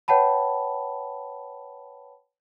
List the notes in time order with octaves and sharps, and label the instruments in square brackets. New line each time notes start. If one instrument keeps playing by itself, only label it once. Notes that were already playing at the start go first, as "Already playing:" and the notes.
[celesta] B4 C#5 F#5 G5 A5 B5